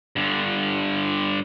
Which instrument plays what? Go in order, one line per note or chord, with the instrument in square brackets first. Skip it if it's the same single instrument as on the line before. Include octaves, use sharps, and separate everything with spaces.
[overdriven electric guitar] G2 D3